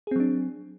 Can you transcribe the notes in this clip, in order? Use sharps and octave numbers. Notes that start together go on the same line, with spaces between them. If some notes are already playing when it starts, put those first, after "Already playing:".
F#3 C4 D4 G#4